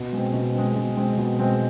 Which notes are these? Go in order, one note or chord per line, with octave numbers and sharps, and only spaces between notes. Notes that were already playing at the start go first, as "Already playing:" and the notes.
Already playing: B2
G#3 C4
B2
G#3 C4
B2
G#3 C4
B2
G#3 C4